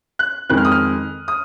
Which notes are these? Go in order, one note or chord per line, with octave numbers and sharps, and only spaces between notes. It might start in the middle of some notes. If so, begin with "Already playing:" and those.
F#6
F2 D#3 G#3 F#6
F6
D#6
F6
D#6